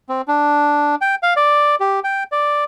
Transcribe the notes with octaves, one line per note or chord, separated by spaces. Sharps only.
C4
D4
G5
F5
D5
G4
G5
D5